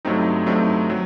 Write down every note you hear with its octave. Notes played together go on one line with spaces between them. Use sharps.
G2 F#3 A3 C4 D#4
G2 F#3 A3 C4 D#4
F#3